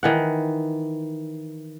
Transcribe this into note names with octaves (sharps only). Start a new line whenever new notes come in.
D#3 E3 F#5